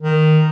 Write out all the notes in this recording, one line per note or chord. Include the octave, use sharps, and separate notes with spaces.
D#3